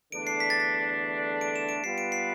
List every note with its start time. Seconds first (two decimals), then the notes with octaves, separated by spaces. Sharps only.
0.12 E2 D3 A3 D4 D7
0.27 C7
0.40 B6
0.50 A6
0.60 B6
1.41 D7
1.56 E7
1.69 D7
1.83 G3 B3 F4 B4 C7
1.98 D7
2.12 C7